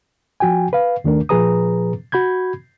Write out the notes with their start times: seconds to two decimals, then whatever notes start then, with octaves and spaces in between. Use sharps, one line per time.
0.40 F3 F#4 G5 G#5
0.73 B4 F5
1.04 D#2 D#3 A3 D4 A#4
1.29 A#2 F3 G#4 B4 A#5 D#6
2.12 F#4 B5 G6 G#6